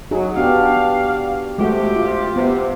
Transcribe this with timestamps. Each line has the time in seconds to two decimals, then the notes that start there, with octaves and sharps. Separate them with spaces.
0.11 F#3 D#4 F#4 G#4
0.37 B3 D4 G4 D5 F5
1.58 C3 F3 G#3 A3 F#4 G4
1.96 F4
2.36 C3 B3